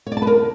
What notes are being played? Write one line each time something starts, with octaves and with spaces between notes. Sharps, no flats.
C#5
D5
A5
B4
A#4